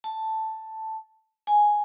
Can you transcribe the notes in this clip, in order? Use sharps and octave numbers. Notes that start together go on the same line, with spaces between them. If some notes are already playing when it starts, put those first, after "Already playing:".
A5
G#5